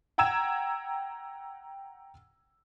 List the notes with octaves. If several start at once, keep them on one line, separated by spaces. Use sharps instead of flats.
F#5 G5 A#5 E6 G#6 E7